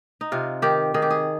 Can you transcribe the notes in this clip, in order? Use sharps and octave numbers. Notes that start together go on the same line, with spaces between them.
D#4
C3 F4
D#3 G4
D#3 G#4
G4
G#4